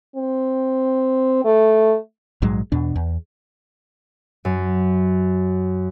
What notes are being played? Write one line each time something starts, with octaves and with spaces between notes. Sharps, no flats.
C4
A3
A#1 G#2 F#3 G#3
E2 B2 D4
E2
F#2